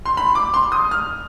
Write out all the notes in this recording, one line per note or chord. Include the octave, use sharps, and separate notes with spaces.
C6
B5
D6
C6
D#6
F6